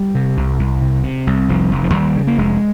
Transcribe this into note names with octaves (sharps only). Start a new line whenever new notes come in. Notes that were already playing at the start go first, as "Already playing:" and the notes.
Already playing: G3
C3
C2
C2
C3
C3
C2
F1 F3
F1
F3
D#2 G3
C#3
A#3
F1 G#3